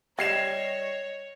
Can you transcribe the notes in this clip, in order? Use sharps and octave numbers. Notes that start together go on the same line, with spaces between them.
G3 C#5 D#5 G#6 C7 E7